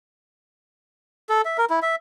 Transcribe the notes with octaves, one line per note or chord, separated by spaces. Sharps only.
A4
E5
A#4
E4
E5